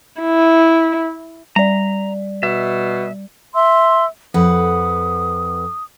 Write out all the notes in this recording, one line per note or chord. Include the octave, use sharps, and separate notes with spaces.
E4
G3 D5 A#5
B2 E5
E5 C6 E6
F2 B4 F#5 D#6